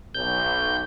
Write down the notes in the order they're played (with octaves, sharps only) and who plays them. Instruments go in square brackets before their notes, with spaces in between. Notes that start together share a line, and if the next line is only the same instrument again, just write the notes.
[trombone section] B1 [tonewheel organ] G6